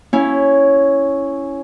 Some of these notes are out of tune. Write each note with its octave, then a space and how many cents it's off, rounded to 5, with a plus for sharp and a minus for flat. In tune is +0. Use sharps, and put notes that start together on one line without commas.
C#4 +0 E4 +0